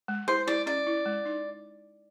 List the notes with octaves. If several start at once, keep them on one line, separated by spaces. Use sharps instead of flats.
G#3
E4 C5
E4 D5
C#4 D5
E4
G#3
D#4